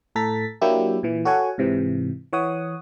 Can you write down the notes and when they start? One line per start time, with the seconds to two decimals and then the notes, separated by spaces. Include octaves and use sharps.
0.15 A2 A4 A#5 A6 B6
0.61 F#3 A#3 D4 E4 G4
1.03 A#2 E3
1.25 F#4 A4 C#5 F#5 G#5
1.58 G#2 C3 E3
2.33 E3 C#5 F#5 D#6